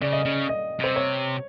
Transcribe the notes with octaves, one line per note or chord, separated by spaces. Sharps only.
C#3 D5
D#5
C#3 D5
D#5
C3 C5
C#5